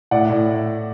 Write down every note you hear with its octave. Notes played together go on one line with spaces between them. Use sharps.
A2 D5 F#5
A2